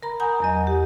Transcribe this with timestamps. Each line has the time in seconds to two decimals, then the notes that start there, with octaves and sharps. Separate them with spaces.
0.03 A#4 A#5 B5
0.20 F#5 G#5 A#5 D#6 G6
0.40 E2 F#3 D#5
0.67 G4